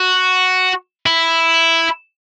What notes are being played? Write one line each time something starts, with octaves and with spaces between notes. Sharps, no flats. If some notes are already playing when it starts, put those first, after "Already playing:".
Already playing: F#4
E4